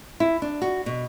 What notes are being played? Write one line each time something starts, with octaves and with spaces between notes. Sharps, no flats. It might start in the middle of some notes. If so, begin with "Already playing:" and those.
E4
D4
F#4
B2